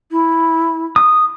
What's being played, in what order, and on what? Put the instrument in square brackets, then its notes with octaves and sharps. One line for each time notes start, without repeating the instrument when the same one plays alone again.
[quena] E4
[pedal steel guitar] D#6